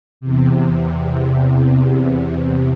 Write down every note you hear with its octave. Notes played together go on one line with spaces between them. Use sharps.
E2 C3